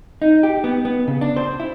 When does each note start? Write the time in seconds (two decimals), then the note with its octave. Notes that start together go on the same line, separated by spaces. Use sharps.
0.22 D#4
0.43 G4
0.64 B3
0.85 B3
1.07 C#3
1.21 D4
1.36 C5
1.60 E4